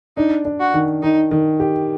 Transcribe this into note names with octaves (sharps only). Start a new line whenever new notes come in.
D4 D#4
D4
F#4
D#3
D#3 D#4
D#3
G4